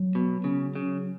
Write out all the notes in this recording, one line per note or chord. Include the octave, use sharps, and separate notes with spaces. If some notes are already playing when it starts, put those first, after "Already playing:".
Already playing: F#3
B2
C#3
C#3